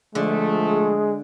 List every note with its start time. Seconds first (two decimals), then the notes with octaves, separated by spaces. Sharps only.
0.15 D3 F3 G#3 A3 G#4